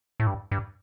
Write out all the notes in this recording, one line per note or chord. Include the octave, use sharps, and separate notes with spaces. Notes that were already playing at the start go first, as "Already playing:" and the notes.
A2
G2
G2